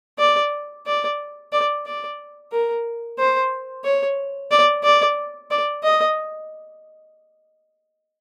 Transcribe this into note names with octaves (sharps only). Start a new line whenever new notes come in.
D5
D5
D5
D5
A#4
C5
C#5
D5
D5
D5
D#5